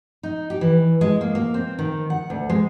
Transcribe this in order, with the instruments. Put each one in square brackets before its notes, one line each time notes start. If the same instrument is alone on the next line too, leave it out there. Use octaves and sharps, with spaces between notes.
[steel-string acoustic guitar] D#4
G4
E3
G#3
A#3
A#3
C4
D#3
F#5
D2
G#3